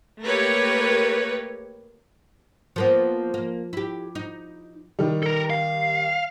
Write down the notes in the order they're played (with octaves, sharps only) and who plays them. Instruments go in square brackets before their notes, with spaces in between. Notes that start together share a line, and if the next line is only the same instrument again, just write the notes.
[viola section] A3 A#3 G4 A#4 B4 C#5
[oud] F3 A#3 B3
A#3
E4 G4
D#4
[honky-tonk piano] D#3 G3
[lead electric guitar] A4 A#4
F5